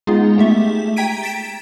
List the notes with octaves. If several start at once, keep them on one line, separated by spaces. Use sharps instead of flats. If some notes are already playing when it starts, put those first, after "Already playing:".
G#3 B3 D#4 F4 G#4
A3 G4 E5
G5 A#5 G#6 B6 D7 D#7
A6 B6 D7 E7